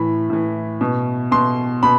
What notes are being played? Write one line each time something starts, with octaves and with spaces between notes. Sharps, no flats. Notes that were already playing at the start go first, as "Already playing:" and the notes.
Already playing: A2 E3 B5
A2 E3
B2
B2 C6
B2 B5